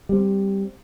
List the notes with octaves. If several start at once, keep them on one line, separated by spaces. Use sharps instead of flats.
G3 C4